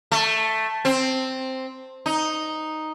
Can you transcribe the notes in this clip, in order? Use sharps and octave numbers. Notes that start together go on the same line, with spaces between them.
A3
C4
D#4